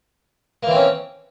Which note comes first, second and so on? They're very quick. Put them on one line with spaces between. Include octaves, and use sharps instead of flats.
A#3 E3 C4 C#4